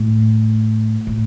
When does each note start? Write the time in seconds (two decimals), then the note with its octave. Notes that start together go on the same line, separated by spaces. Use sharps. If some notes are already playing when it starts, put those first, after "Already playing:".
Already playing: A2
1.07 A2